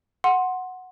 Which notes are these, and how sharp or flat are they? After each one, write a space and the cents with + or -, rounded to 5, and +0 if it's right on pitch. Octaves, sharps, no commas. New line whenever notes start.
F#5 -5 C6 +10